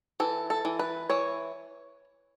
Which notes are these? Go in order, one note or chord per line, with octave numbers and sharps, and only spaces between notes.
E3 A4
A4
E3
B4
E3 C#5